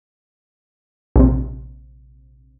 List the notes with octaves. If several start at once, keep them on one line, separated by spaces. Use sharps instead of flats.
A#1 C3